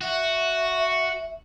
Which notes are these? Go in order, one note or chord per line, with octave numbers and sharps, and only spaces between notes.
F#4 E5